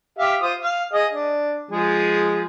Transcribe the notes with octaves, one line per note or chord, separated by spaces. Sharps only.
G4 E5 F5
F4 C5 D#6
F5
G#4 D#5
D4
F3 G#3 G#4